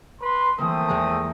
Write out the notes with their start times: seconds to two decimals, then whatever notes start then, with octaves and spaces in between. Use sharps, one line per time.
0.20 B4 C6
0.58 E3 G3 A3 A#3 C4 D#6
0.88 E2 G#3 A#5